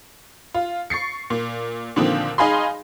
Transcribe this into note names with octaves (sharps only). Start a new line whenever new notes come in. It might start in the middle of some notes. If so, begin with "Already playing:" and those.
F4
C#6 A6 C7 C#7
A#2
A#2 D3 D#3 F3 A#3 C4
D#4 G#4 F5 G#5 B5 C6